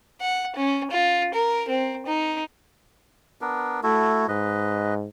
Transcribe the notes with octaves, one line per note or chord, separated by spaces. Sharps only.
F#5
C#4
F4
A#4
C4
D#4
B3 D4 A#4
A3 E4 F#4 A4
G#2 B4 D#5